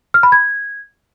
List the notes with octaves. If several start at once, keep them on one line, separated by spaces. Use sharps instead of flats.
F6
B5
G#6